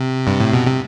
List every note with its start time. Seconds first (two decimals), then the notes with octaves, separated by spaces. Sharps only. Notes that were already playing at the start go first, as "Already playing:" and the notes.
Already playing: C3
0.27 G2
0.40 A2
0.53 B2
0.67 C3